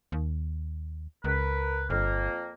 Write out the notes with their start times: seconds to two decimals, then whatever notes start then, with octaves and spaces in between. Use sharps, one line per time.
0.12 D#2
1.24 C#2 A#4 B4
1.90 G1 F2 A#3